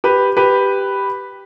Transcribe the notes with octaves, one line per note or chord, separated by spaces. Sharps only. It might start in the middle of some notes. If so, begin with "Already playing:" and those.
G4 B4
G4 B4